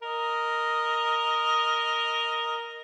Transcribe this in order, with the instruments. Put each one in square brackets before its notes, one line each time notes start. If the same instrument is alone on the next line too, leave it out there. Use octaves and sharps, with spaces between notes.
[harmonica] A#4 D#5